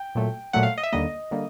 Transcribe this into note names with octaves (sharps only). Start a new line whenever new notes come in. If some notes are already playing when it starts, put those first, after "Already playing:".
Already playing: G5
A#2 F#3 A3
A#2 F#3 A3 F#5
F5
D#5
E5
D#2 D3 G3 A#3 D#5
D3 G3 A#3